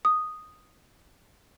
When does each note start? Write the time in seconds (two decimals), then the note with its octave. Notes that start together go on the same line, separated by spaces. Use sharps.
0.05 D#6